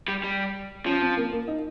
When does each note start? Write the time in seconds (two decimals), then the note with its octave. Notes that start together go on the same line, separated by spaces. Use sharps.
0.08 G3
0.24 G3
0.86 F3 C#4
1.02 C4
1.17 A#3
1.32 A#3
1.48 D#4